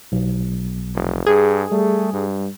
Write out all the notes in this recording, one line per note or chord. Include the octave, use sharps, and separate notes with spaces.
B1
F1
G2 G#4
G3 A3
G2